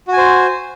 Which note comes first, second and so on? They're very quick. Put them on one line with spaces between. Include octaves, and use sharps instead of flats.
F#4 G#5 C5